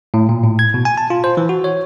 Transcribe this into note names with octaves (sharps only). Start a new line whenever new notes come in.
A2
A#2
A2
G#6
B2
G#5
A5
F4
C5
E3
F#4
C#5